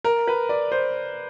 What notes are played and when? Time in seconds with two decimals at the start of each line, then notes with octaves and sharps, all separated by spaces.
0.04 A#4
0.27 B4
0.49 D5
0.72 C5